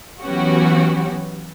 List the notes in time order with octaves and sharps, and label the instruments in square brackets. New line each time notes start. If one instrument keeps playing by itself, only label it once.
[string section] E3 F#3 B3 C#4 F#4 G4